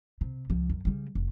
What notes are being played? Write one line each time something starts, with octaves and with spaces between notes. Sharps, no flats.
C3
C#2 F3
F#2
C#3 G3
F1